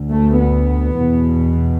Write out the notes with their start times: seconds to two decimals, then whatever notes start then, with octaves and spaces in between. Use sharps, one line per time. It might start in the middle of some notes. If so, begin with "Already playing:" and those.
Already playing: D2
0.11 A3
0.40 B3
0.97 E2 B2